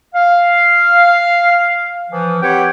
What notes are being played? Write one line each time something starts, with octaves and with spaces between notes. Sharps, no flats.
F5
E3 F3
C4 G4 B4 C#5 F#5 G5